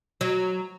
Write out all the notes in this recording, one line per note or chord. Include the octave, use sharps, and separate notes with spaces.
F#3